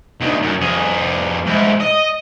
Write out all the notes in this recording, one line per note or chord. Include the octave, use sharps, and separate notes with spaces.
D2 D#3
F#2
F2 G#4
G#2 E4
D#5